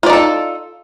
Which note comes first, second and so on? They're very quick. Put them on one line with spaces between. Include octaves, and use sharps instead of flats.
F4 D5 D#4 A4